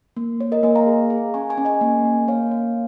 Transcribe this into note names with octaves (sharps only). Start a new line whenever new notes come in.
A#3
A#3 C#5
A#4 D#5
A#3 D#5 G#5
F5 A#5
G#4
G#4
C#4 G#5 C#6
G#5 C#6
C#4
D#5 G#5
A#3
A#3
A#3 C#5 F5
A#3